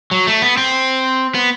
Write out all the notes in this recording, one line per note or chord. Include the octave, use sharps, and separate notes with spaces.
F#3
A3
B3
C4
B3